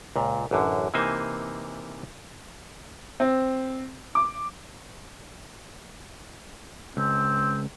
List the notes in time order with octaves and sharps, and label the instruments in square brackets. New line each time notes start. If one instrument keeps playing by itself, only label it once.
[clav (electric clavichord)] C#2 A#2
A1 F#2 D3
C3 E3 A#3 D#4 C5 G#5
[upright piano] C4
D6
[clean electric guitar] C#2 [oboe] C4